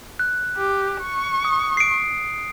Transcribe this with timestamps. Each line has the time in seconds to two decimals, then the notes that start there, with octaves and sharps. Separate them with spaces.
0.19 F#6
0.57 G4
1.03 C#6
1.45 D#6
1.77 C7 D7